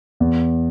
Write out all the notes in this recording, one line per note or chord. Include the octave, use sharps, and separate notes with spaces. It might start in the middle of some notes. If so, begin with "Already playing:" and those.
E2